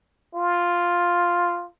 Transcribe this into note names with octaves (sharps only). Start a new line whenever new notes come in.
F4